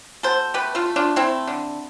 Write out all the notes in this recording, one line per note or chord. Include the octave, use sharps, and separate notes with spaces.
B2 A4 C5
A3 G4 B4
F4 A4
A3
D4 F4
A3 C4 E4
D3